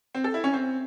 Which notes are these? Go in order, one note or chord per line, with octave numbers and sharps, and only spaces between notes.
C4
A4
E4
C#4
C4